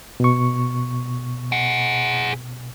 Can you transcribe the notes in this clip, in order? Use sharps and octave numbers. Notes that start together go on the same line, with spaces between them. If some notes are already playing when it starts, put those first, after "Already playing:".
B2 C#6
G#4 F#5